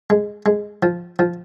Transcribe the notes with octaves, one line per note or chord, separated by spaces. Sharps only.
G#3
G#3
F3
F3